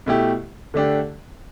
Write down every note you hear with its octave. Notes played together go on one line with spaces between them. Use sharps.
B2 A3 E4 G4
D3 A3 D4 G4